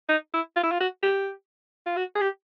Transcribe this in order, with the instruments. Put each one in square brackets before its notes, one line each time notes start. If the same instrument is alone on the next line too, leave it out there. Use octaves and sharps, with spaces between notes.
[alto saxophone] D#4
E4
F4
E4
F4
F#4
G4
F4
F#4
G#4
G4